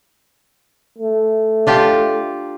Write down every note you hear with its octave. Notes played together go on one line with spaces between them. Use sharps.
A3
D4 F4 G4